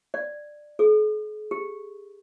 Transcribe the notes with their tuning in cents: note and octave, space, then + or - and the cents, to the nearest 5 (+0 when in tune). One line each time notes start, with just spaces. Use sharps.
D5 +15
G#4 +45
G4 +35